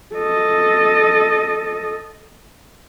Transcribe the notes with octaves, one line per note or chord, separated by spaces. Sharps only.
A4 D#5